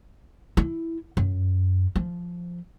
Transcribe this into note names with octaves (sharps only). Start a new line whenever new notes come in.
E4
F#2
F3